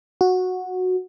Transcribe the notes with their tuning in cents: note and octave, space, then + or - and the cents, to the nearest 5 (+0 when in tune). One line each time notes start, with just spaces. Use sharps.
F#4 -10